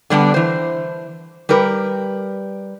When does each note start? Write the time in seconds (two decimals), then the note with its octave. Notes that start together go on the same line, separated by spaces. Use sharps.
0.10 D3 G3 B3 D4
0.34 E3 C5
1.49 G3 G4 A#4 B4